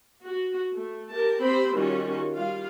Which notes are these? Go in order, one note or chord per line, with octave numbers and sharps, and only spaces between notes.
F#4
A3
G4 A#4 A5
C4 G4 C5 B5
D#3 G3 C#4 F4 F#4
G3 F4 F5